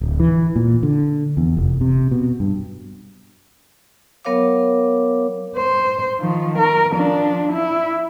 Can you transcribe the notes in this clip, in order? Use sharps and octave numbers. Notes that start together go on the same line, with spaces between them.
D1
E3
A#2
D3
E2
F1
C3
B2
G2
F#3 B3 A#4 C#5 F5 D6
C5
D#3 F3
A#4
F3 D4
E4